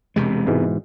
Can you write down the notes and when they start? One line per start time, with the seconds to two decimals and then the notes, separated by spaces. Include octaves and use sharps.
0.16 E1 C3 G#3
0.47 G#2 B2 E3